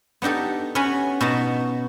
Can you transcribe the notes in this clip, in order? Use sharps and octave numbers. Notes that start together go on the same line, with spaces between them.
B3 D4 D#4 G4 A4
B3 C#4 F#4 G#5 B5
B2 B3 D#4 A5